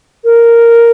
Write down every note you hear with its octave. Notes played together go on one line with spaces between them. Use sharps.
A#4